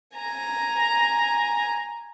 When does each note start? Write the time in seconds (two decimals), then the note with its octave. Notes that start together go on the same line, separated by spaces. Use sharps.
0.16 G#5 A#5